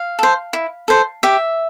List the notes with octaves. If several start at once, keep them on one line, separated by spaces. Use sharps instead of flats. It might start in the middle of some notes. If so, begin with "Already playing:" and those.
Already playing: F5
A4 C5
E4
A4 C5
G4 E5